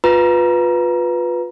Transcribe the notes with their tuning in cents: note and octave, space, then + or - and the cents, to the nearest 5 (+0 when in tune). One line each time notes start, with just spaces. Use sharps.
F4 +25 B4 +0 A#5 +20